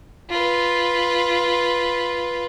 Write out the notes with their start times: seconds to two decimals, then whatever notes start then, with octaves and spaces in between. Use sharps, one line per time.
0.30 F4 B4